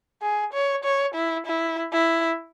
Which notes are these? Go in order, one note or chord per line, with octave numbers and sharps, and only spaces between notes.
G#4
C#5
C#5
E4
E4
E4